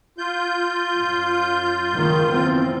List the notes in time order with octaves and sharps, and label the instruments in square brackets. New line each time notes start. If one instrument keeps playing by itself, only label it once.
[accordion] F4 G6
[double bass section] F#2
F#1 C#2 D#3
E2 C4